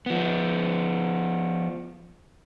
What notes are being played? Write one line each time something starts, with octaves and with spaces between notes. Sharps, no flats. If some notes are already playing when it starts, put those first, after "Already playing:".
F3 B3